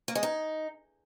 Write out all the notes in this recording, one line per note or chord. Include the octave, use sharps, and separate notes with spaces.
A#3
G#3
D#4